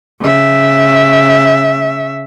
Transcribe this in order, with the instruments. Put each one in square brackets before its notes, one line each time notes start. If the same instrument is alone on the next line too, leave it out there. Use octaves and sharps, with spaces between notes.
[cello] C#3 E5